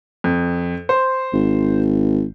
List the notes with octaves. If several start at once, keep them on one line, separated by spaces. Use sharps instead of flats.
F2
C5
G#1